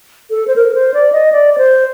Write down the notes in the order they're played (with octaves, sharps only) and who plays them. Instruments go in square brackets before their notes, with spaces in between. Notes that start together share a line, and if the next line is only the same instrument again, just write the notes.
[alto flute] A4
C5
A#4
C5
D5
D#5
D5
D5
C5